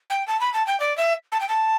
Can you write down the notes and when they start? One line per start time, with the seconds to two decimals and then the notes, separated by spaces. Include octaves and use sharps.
0.10 G5
0.27 A5
0.40 B5
0.53 A5
0.67 G5
0.80 D5
0.97 E5
1.32 A5
1.40 G5
1.49 A5